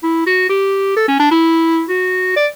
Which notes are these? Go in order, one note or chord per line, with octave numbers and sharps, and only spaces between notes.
E4
F#4
G4
A4
C#4
D4
E4
F#4
D5